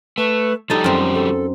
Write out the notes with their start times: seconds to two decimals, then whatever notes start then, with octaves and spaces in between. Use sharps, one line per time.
0.18 A3 B4
0.70 F3 G3 D#4 G4 A4 A5
0.84 F#2 C4
1.14 A4